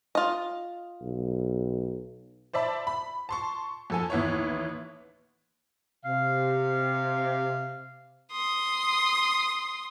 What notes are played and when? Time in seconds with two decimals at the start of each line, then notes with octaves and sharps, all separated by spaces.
0.15 F4 D#5
1.02 B1
2.53 C5 D5 E5 A5 B5
2.87 B5
3.29 A5 C6 C#6
3.90 F2 A4 G#5
4.10 A1 D#2 B3 E4 C#5
6.05 C3 F5
8.32 C6 D#6